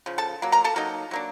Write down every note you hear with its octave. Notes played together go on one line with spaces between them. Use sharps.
C#3 F3
A4 A5
F#3 A#3
A#4 A#5
A4 A5
F#3 A#3 D#4
F#3 A#3 D4